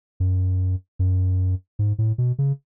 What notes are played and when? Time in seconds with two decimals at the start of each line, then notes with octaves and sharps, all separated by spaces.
0.20 F#2
0.99 F#2
1.79 G#2
1.98 A2
2.18 B2
2.39 C#3